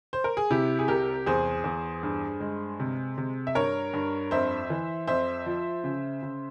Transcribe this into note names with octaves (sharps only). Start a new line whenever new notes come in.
C5
A#4
G#4
C3 E4 G4
G#4
C2 G4 A#4
E2 G#4 C5
E2
G2
G#3
C3
C3
E5
G2 A#4 C#5
G2
F2 C5 E5
E3
F2 C5 E5
F3
C#3
C#3